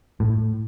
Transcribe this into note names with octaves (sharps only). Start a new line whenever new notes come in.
A2